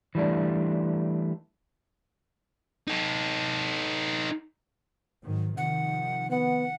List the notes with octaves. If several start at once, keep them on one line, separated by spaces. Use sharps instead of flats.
E3 G3 A3 D4
D#4 A4
G#2 D#3 F#3
C3 D#3 F3 F#5
B3 F#5